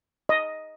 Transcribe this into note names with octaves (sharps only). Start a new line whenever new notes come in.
D#5